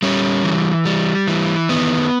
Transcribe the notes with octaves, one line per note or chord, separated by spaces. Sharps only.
G3 C#4
E3
G3
E3
D#3 B3